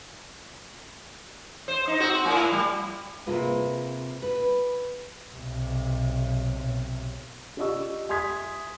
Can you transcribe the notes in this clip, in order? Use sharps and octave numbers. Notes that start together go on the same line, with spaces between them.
C5
D#4
C4 F#4 C5
A2 A#4
G3
C3 A#3 F4 G#4 B4
B4
B1 C3
F4 G4 D5 D#5 C#6 E6
E5 G#5 C6 D#6 G#6 B6